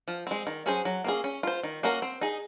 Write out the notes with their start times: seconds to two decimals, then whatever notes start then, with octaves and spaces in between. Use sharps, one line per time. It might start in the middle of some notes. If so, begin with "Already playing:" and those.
0.08 F3
0.27 G#3 C4
0.47 D#3
0.66 F#3 C#4 G#4 C5
0.85 F#3
1.04 A#3 C#4 G#4
1.24 C#4
1.43 F4 C5
1.63 D#3
1.83 A#3 C#4 F#4 A#4
2.02 C4
2.21 D#4 G#4